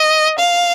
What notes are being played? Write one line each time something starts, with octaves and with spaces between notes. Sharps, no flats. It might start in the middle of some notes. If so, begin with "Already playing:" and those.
Already playing: D#5
F5